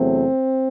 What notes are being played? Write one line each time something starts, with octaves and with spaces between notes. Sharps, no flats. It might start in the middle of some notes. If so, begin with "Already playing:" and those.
Already playing: E2 C3 F#3 A3 C4